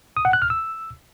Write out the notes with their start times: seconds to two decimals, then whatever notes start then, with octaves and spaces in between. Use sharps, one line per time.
0.17 D#6
0.25 F#5
0.33 F#6
0.42 F6
0.50 E6